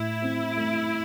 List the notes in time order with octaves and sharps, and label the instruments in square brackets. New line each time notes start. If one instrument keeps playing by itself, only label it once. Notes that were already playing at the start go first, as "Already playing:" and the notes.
Already playing: [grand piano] A2 [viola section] E4
[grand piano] C4
A3